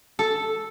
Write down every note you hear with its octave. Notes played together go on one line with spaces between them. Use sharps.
A4